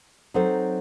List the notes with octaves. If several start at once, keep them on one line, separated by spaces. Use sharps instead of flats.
F#3 C4 D#4 A4 C5